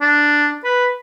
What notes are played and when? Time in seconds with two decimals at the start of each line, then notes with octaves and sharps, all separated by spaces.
0.01 D4
0.65 B4